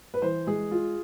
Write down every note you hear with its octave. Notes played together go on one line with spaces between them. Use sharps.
B4
E3 C5
G#3 G#4
F4